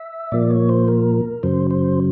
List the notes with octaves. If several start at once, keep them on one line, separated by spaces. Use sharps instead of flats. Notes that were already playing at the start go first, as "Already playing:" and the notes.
Already playing: E5
A#2 F3 A#3 D5
C#5
C5
A#4
F#2 C#3 F#3 C5
C5